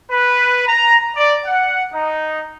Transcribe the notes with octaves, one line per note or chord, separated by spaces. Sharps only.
B4
A#5
D5
F#5
D#4